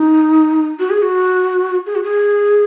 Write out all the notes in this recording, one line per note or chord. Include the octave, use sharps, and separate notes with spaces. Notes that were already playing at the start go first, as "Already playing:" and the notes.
Already playing: D#4
F#4
G#4
F#4
G#4
F#4
G#4